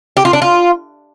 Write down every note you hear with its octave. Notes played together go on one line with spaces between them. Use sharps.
G4
F4
D4
F4